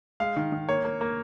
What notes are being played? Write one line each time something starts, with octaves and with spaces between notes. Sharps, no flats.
G#3 F5
D#3
D#3
A#3 C#5
A#3
A#3